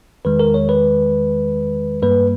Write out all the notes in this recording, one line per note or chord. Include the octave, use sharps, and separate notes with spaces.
E2 D#3 G#3 B4
A#4
C#5
B4
G2 G3 A#3 B4